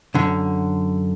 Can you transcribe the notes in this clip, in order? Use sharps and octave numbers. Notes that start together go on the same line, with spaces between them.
F#2 D3